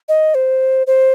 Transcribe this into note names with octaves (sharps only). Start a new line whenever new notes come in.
D#5
C5
C5